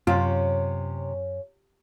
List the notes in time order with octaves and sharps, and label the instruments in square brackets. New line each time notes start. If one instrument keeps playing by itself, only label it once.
[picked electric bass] F#2 [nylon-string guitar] C3 [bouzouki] C#4 [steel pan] F4